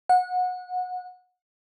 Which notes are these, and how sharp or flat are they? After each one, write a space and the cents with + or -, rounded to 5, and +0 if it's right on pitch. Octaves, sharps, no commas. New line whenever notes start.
F#5 -25